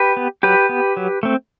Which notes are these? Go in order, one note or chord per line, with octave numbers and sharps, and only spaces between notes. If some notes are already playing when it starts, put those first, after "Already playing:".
Already playing: G4 B4
B3
F#3 G4 B4
B3
F#3
A3 C4